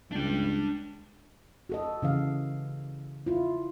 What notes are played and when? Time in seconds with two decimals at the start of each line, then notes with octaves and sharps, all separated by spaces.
0.12 C#2 D4 G5
1.69 F#4 A4 D#5
2.02 C#3 E3 F5
3.26 E4 F4